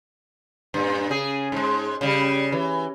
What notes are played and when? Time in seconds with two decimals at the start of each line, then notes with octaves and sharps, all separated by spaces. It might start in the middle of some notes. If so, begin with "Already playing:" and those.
0.74 G2 A#2
1.09 C#3 G#4
1.52 G#2 G#3
2.01 C#3 G3
2.52 E3